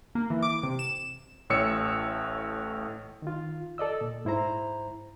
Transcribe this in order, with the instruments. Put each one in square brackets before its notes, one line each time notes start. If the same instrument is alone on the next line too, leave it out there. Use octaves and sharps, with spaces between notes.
[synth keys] A#3
E3
D6
C3
E7
[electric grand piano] A1 A2 C#5 E6 C#7
[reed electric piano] D#3 F4
A4 D5 D#5 E6
A#2
G#2 E4 C5 A#5